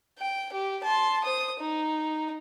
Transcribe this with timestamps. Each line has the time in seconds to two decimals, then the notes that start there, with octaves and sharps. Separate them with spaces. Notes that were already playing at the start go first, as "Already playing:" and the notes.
0.18 G5
0.53 G4
0.84 A5 C6
1.24 C5 D#6
1.59 D#4